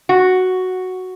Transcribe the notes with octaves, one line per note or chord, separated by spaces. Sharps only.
F#4